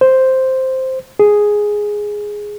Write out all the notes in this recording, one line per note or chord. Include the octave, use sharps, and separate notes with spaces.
C5
G#4